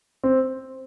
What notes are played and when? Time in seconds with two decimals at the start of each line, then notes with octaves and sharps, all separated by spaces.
0.24 C4